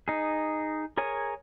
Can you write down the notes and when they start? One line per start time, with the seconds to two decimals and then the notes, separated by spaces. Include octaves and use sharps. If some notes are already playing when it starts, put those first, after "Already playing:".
0.08 D#4 G#4
0.97 G#4 A#4 C#5 G#5